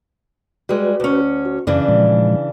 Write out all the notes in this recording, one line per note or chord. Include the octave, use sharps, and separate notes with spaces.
G3 G#3 F#4 B4
D2 C#4
F#4
F#2 C#3 E3 D4
A#2 F3 G#3